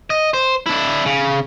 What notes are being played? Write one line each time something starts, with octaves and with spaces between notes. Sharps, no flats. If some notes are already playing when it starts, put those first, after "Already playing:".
D#5
C5
D4 E4
C#3